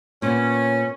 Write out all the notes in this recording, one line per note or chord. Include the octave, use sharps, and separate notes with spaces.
A#2 B3 C#4